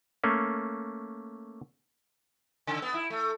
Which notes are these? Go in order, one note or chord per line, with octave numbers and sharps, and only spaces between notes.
A3 A#3 C#4
C#3
B3
E4
A3